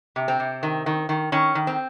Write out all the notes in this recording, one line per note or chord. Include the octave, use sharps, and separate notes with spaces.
C3
C4
C3
D#3
D#3
D#3
D#3 C#4
D#3
C4